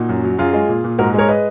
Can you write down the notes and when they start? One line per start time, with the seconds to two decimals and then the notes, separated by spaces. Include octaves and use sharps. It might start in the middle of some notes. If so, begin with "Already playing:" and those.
Already playing: A#2 D#4 F#4
0.09 F#2
0.24 F#3
0.39 F#2 F4 G#4
0.53 G#3
0.69 A#2
0.84 A#2
0.99 G#2 F#4 A#4
1.14 G#3 A#4 C#5
1.28 B4 D#5